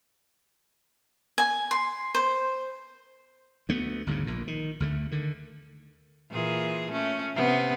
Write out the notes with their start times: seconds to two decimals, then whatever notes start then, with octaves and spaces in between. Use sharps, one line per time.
1.38 G#5
1.71 C6
2.15 C5
3.69 D2 A3 B3
4.07 G1 D2 G#2 C#3
4.27 A#1 A#2
4.47 D#3
4.80 D2 D3 A3
5.11 D3 D#3
6.31 A#2 E3 G#4
6.91 A3 C#4
7.35 C3 B3 C#4